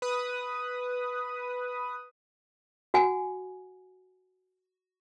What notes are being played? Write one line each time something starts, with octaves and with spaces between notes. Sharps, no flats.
B4 D#6
F#4 F#5 G#5